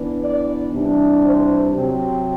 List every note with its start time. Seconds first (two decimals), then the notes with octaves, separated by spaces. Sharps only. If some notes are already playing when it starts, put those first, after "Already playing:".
Already playing: E3 B3 D4
0.21 D5
0.72 C3 E3 G3 D4
1.24 C5
1.75 C3 F#3 C4